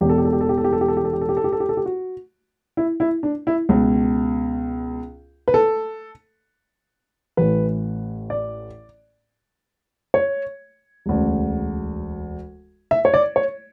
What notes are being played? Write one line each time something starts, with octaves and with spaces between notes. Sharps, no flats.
E1 E2 B2 G4
A4
G4
A4
G4
A4
G4
A4
G4
A4
G4
A4
G4
A4
G4
A4
G4
A4
G4
A4
G4
A4
G4
F#4
E4
E4
D4
E4
C#2 B2
B4
A4
A1 A2 E3 B4
D5
C#5
E1 D2 C#3
E5
C#5
D5
C#5